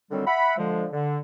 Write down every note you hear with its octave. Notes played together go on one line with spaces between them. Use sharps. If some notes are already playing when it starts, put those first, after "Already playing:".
D3 D#3 F#3 G3 C4
E5 F#5 B5
D3 F3 G#3
D3